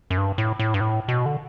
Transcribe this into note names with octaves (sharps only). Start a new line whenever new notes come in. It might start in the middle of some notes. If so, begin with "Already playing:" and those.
F#2
G2
A2
A2
G2
A2
B2
D3